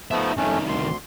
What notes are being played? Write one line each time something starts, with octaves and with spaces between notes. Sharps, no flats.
F3 A3 B3 D#4 E5
C2 F2 D#3 A3 C#4
D2 C6